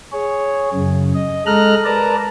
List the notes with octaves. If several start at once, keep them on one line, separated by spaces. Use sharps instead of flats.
G#4 C#5
F#2 C#3
D#5
G#3 A4 D#5 A#5 F6 F#6
A#4 B4 D5 A5 A#5